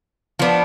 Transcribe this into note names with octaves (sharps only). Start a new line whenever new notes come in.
F3 B3 D4